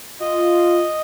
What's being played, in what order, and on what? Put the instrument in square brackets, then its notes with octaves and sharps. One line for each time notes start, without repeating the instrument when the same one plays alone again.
[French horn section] F4 [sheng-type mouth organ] D#5